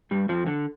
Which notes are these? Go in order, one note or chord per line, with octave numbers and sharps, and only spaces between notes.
G2 G3
F2 F3
D3